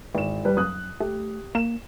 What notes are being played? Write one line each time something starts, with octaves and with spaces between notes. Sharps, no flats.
G#1 E3 E7
G3 B4
F#2 D#6 F#6
A3 G4
A#3 E7